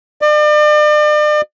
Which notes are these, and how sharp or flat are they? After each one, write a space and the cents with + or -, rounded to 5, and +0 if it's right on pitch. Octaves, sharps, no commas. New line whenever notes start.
D5 +40